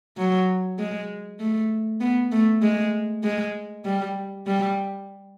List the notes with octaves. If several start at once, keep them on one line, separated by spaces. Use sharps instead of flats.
F#3
G#3
A3
B3
A3
G#3
G#3
G3
G3